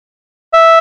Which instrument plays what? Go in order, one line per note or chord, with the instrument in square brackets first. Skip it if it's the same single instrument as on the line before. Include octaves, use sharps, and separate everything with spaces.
[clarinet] E5